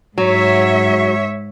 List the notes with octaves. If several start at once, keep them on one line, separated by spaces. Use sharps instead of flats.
G#2 F#3 C#5 E5